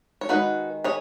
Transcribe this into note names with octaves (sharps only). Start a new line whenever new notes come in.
C#5
D#3 G#3 D#4 F#4 B4
G#4 C#5